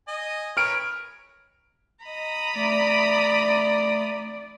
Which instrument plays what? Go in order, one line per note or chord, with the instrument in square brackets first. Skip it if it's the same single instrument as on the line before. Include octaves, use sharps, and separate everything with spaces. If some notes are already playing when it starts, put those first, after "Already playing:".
[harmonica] D#5 G#5
[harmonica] A#4 B4 C#5 [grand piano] F6 D7
[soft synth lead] D#5 [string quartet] A#5 B5 D#6
[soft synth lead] A3 [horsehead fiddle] D5